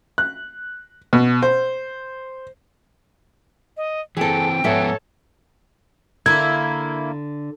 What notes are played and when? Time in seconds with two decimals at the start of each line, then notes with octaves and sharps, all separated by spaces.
0.18 F#6
1.13 B2
1.43 C5
3.77 D#5
4.17 E3 C4 G#4 A4 G5
4.64 G#2 F3 B3 A4 C#5 E5 F#5
6.26 D3 A#3 E4 G#6